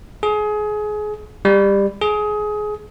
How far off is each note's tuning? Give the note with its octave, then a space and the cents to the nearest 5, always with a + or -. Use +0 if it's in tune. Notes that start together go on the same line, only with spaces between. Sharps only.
G#4 +25
G3 +20
G#4 +20